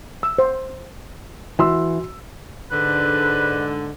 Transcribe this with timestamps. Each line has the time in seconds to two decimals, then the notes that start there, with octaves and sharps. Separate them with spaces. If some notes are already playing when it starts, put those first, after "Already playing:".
0.23 E6
0.38 C5
1.59 E3 F#4 C6 E6
2.72 G#2 D3 B4